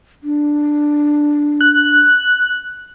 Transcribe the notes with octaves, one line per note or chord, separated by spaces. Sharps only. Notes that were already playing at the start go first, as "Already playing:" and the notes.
D4
F#6